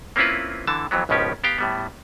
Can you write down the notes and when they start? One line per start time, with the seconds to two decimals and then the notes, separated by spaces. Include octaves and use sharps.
0.16 A#3 C4 C#4 E4 F4 B4
0.67 D3 E3 A5
0.91 F2 E3 F#3 B3
1.09 G#1 C#2 B2 F3 C#4 G4
1.44 B3 G4 F5 G5 A#5
1.59 A2 G3 B3